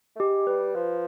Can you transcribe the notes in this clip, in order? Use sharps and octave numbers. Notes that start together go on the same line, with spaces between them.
A3
G#3 G4
G3 B4
F3 B4